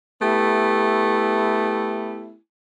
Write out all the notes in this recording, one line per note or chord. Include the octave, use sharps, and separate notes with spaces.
A3 B3 E4 G4